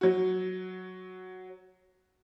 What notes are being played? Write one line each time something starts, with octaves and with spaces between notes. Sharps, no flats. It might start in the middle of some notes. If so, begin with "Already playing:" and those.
F#3 F#4